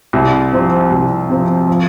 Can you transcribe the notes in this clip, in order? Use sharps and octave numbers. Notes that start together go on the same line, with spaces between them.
C2
C3 F3 C4
C2
C3 F3 C4
F3